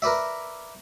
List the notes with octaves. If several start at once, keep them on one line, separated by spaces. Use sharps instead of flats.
A#4 B4 D5 E5